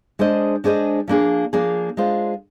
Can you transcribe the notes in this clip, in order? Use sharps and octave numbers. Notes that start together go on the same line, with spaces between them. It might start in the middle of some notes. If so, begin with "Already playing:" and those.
G#3 D4 G#4 C5 D#5
G#3 D4 G#4 C5 D#5
F3 A#3 D4 G#4
F3 A#3 D4 G#4
G#3 D4 F4 C5